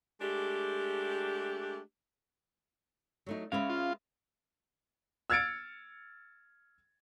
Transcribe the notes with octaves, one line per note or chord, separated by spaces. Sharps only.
G#3 A3 D4 G4
F#3 A3 D#4
G#3 C#4 B4 E5 F5
F4
E6 F6 G#6 A6 C#7 D7